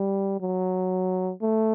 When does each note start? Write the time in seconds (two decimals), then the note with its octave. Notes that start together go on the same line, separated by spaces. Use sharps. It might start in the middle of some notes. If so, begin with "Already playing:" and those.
Already playing: G3
0.41 F#3
1.42 A3